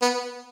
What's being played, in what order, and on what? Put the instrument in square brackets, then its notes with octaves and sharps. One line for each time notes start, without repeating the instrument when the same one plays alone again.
[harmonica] B3